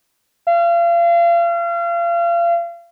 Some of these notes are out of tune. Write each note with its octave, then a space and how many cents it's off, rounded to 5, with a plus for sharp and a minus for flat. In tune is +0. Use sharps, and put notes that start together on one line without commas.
F5 -35